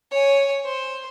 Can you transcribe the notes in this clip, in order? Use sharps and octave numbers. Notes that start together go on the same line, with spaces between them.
C#5 G#5
C5